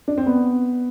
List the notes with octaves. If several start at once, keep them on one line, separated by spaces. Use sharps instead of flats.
D4
C4
B3